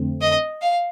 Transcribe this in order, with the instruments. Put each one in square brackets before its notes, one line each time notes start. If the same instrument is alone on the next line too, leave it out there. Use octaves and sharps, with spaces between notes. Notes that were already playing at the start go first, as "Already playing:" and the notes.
Already playing: [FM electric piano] F2 D3 A3 C4
[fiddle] D#5
F5